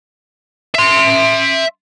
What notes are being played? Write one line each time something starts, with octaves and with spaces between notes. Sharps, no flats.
E5 C6